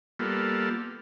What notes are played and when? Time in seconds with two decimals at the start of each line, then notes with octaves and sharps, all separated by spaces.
0.19 G3 A#3 B3 F4 A4